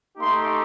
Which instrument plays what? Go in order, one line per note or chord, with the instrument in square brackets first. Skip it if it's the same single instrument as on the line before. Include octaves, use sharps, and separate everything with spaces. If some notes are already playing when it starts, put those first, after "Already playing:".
[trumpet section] A3 D#4 G4 C6